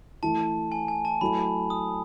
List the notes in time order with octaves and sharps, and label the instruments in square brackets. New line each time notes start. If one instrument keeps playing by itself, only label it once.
[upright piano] E3 A3 E4 [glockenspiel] A5
[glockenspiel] G#5
G#5
A5
[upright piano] F#3 A3 E4 A4 [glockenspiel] B5
[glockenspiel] D#6